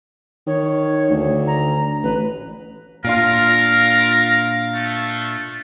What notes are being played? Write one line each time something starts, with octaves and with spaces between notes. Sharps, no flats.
D#3 C#5
D2
A#5
A1 B4
A#2 D4 F4 A#4 F5
A3